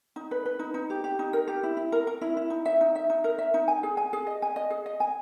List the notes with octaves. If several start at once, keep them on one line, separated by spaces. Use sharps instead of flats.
D#4
B4
B4
D#4
D#4
G4
G4
D#4
A#4
G4
E4
E4
A#4
A#4
E4
E4
D#4
E5
D#4
E5
D#4
A#4
E5
D#4
G#5
G#4
G#5
G#4
D#5
G#5
D#5
G#4
D#5
G#5